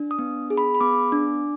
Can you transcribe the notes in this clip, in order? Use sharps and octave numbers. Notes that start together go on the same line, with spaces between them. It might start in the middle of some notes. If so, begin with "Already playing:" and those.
Already playing: D4
D#6
B3
G#4
B5
B5
B3 D6
D4